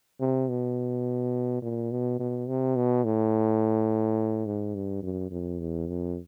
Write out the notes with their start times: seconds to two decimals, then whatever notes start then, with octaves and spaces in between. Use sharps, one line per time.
0.20 C3
0.50 B2
1.62 A#2
1.92 B2
2.20 B2
2.48 C3
2.76 B2
3.05 A2
4.46 G#2
4.75 G2
5.03 F#2
5.31 F2
5.60 E2
5.88 F2